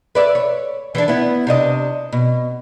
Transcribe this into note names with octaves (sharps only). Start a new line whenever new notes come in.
B4 D5 E5
C#5
E3 G3 D4
B3 E4
C3 D4 D#5
B2